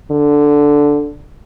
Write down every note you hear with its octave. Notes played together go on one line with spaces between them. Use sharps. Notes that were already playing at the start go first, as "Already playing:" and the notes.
D3